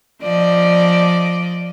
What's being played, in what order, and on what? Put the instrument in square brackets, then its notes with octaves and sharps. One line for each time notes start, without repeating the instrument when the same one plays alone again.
[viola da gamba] F3 D5 D#5